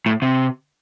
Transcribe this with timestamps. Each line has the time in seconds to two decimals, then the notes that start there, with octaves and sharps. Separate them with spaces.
0.06 A2
0.22 C3